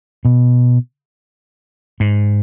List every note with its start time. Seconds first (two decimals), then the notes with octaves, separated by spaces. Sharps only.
0.25 B2
2.00 G#2